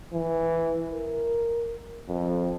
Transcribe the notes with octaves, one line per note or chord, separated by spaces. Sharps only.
E3
A#4
F2